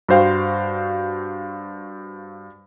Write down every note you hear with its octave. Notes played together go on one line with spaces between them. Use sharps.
G2 F#4 C5 F5 G5